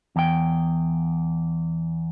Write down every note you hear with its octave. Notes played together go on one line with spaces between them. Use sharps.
E2 G5